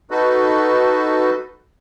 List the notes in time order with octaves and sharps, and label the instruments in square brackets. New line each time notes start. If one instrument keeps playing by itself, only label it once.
[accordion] D#4 F#4 A4 B4